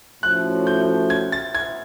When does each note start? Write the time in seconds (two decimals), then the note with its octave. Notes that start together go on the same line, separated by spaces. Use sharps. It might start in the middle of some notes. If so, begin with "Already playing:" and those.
0.22 A2 F3 A3 C#4 F#4 F#6
0.67 G6
1.10 G#6
1.32 A6
1.55 G#6